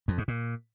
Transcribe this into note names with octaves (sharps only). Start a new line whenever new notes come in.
F2
G#2
A#2